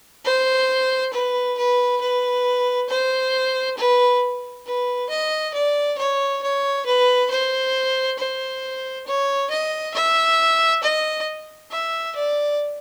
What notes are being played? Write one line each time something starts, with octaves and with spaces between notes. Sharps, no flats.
C5
B4
B4
B4
C5
B4
B4
D#5
D5
C#5
C#5
B4
C5
C5
C#5
D#5
E5
D#5
E5
D5